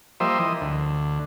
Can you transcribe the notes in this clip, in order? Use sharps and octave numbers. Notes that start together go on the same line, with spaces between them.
F3 G3 A#3 C5 D#5 E5
E3 D#5
D2